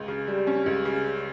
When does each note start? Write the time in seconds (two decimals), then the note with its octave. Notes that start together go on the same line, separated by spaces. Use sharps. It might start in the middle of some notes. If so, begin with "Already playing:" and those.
Already playing: C#2
0.08 C#3
0.27 G3
0.47 C#4
0.66 C#2
0.85 C#3